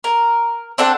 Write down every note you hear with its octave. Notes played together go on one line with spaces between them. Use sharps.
A#4
C4 D4 A4 F#5